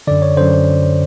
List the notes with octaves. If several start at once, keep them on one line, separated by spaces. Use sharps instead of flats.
F#2 D3 D5
C#5
F#2 D3 C5